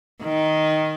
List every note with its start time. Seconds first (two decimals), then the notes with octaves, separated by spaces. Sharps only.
0.23 D#3